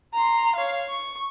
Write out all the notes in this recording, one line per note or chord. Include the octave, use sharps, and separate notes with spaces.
A#5 C6
C#5 F5
C#6